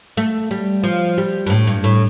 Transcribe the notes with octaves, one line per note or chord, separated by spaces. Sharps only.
A3
G3
F3
G3
G2
A2
G2
A2